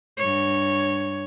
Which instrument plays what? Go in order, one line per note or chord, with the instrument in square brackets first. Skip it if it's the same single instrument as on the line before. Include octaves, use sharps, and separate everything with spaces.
[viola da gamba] G2 C#5